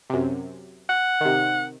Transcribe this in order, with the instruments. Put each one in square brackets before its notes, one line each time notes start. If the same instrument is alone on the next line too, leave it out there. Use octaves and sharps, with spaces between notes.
[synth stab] F#2 C3
[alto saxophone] F#5
[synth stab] C3 D#3